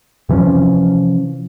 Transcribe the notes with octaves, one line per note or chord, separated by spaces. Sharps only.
C3 E3 F3 C#4